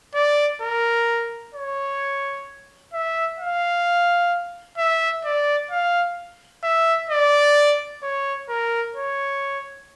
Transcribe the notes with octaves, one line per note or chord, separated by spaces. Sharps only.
D5
A#4
C#5
E5
F5
E5
D5
F5
E5
D5
C#5
A#4
C#5